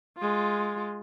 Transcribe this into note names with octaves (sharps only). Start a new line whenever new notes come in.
G#3 F4